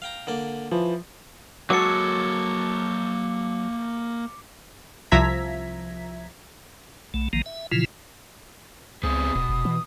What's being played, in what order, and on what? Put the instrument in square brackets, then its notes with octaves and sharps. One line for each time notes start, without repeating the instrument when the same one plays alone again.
[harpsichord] F5 G5 A#5
D3 A#3 D5
[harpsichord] E3 [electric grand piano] F3
[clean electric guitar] F#3 A4 [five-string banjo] G#3 F#4 [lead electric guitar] A#3 C#5 [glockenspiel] D6 C#7
[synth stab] C2 F3 E5 A#5 G#6 B6
[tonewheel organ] B1 A3
A#1 D#3 F3 A#3
E5
A#2 C#3 E3 F3 E4 F4
[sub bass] C#2 [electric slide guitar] B3 C4 G#4 [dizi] D#6
[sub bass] D1 [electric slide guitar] B2
[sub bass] F1
E3